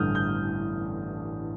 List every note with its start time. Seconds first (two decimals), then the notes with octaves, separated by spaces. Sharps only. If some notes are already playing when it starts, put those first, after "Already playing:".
Already playing: A1 G2 D3 D#6 F6 G6
0.15 G6